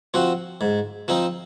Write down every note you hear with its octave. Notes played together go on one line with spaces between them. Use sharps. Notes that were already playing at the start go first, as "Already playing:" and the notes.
F3 C4 F#4
G#2
F3 C4 D#4